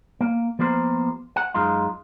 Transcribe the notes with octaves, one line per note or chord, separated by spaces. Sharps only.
A#3
F3 A#3 B3 G4 A#4 C5
F#5
F#2 G#3 D#4 F4